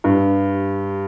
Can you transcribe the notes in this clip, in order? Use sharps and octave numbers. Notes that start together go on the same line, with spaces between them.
G2